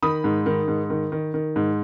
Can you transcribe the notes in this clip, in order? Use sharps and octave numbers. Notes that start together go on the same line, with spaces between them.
D#3 B5 D#6
G#2
D#3
G#2
D#3
D#3
D#3
G#2